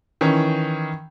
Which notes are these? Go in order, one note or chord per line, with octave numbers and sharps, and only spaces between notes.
D#3 E3 C#4